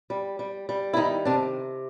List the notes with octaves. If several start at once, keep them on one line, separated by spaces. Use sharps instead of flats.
G3
G3
G3
E4
D#3 D#4
C3 D4